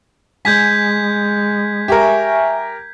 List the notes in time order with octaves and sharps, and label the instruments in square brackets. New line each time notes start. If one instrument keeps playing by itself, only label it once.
[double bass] G#3 [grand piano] G#5 [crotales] G6 G#6 B6
[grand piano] G4 A#4 [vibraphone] E5 G#5 C#6